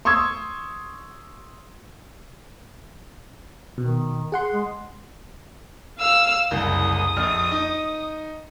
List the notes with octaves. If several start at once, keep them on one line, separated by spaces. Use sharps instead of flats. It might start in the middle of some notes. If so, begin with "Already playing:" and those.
C6 C#6 D#6 E6 G#6
B2 D#3
G#4 F#5 C6
G#3
F5 E6 F6
F#1 C2 D#6
A#1 F2 F6
D#4